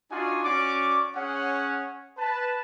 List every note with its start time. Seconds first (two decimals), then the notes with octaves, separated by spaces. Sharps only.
0.10 D4 D#4 F4 F#4 D5 G#5
0.43 C#4 F#4 D5 C#6 D6
1.15 C#4 G#4 C#5 F#5
2.18 B4 A5